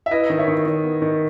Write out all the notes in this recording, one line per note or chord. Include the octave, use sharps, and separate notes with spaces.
E5
E4 B4 D#5
D#3
C#5 E5
D#3
D#3
B3
D#3